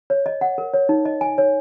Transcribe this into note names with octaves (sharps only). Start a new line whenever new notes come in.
C#5
D#5
F#5
A#4
C#5
D#4
D#5
G#5
C#5